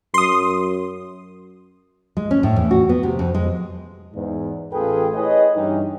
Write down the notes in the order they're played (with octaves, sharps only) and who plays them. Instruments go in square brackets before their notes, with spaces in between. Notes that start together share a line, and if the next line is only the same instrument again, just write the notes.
[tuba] F#2 [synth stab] C6 D#6
[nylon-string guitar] G#3
C#4
A2
E2
F#4
B3
C3
F2
G#3
[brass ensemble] E2 G#2
A1 F4 G#4 A4 B4 G5
E4 G#4 B4 C#5 D#5
G2 E3 C#4 D#4 G4